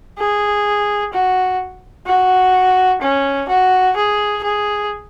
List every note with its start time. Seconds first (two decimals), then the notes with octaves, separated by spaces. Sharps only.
0.18 G#4
1.13 F#4
2.06 F#4
3.01 C#4
3.48 F#4
3.96 G#4
4.43 G#4